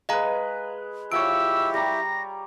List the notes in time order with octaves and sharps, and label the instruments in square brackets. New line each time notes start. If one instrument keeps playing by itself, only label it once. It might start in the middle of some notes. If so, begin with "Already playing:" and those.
[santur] G#3 B4 [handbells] D#5 F5 A#5
[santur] F3 C#5 [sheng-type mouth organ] E4 G4 [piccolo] E6 [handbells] D7
[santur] G3 A#5 [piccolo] A#6